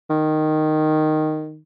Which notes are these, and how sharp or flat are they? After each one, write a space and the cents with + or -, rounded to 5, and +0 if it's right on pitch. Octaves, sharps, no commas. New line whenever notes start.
D#3 -5